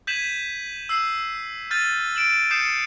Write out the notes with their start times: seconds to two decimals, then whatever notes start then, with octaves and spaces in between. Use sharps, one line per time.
0.07 G6 G#6 B6 D#7 E7 F#7
0.89 E6 C7 F#7
1.71 F6 G6 A6 D#7
2.16 D7 E7 F#7
2.51 D#6 G6 C7 C#7 E7